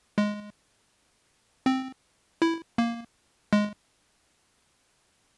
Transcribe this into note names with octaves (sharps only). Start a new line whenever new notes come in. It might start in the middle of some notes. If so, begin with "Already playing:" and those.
G#3
C4
E4
A#3
G#3